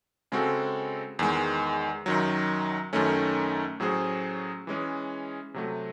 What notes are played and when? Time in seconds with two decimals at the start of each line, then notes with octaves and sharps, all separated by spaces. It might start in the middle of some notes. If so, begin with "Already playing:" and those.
0.32 C#3 G#3 C4 F#4 A4
1.19 E2 D#3 G#3
2.06 F#2 D#3 F#3
2.93 F#2 D#3 A3 C#4
3.80 A2 F#3 C#4 G#4 C5
4.67 E3 G#3 C#4 G#4
5.54 C3 F#3 A3